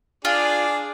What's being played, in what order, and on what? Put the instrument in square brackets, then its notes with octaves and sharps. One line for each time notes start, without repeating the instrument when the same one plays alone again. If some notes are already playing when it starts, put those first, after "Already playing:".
[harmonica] D4 G#4 D5 [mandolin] F4